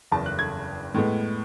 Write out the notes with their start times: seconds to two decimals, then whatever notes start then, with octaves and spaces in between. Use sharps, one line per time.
0.12 F#1 E2 C#3 A5
0.26 F#6
0.39 G#6
0.94 A2 G#3 B3